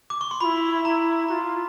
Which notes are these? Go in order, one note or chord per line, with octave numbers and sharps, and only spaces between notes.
D6
C#6
C6
E4 F4 B5
E4 A#5
F4 F#4 A#5